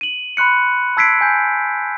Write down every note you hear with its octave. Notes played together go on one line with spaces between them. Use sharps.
D#7 F#7
B5 C6 F#6 C#7
A5 E6 G#6 B6 C7 D7
G#5 G6